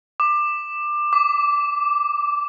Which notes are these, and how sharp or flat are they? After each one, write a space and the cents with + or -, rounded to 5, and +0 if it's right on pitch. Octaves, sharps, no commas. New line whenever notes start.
D6 +20
D6 -10